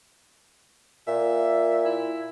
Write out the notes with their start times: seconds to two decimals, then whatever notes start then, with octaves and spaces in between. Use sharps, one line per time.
1.08 A#2 E5
1.85 E4